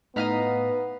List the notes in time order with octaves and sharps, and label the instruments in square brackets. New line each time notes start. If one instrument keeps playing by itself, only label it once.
[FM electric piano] A2 D#4 B6 [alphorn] B3 [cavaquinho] D#5 F5 A#5